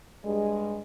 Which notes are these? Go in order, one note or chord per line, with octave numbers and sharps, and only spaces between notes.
G2 G#3